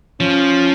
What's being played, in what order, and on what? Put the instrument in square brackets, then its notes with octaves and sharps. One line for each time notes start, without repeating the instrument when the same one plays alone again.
[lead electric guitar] F3 [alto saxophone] C#4